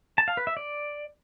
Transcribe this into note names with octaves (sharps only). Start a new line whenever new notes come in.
A5
F5
B4
E5
D5